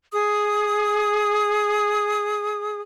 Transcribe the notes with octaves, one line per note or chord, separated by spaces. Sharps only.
G#4 D#6